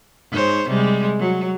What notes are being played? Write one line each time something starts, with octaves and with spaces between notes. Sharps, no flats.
G#2 C5 C#5
C3 G3 G#3
F#3